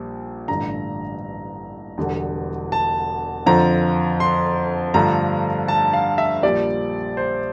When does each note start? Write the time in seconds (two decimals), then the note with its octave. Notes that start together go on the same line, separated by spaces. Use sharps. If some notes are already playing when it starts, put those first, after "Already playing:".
Already playing: A#1 A#2 G3
0.48 A1 G2 D3 A#5
1.98 E1 E2 D3 G3
2.72 A5
3.46 F2 D3 F3 A#5
4.20 C6
4.94 G2 D3 F3 A3 A#5
5.68 A5
5.93 F5
6.18 E5
6.43 A#1 A#2 G3 D5
7.17 C5